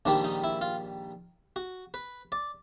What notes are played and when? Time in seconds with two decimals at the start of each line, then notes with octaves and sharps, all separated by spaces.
0.05 A#1 G#2 D#3 G3 D4
0.24 D#4
0.44 E4
0.61 F4
1.56 F#4
1.94 B4
2.32 D5